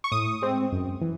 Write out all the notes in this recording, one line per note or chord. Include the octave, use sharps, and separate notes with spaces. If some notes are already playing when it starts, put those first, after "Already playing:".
C#6
A2 D#6
G#3 C4
F#2
E3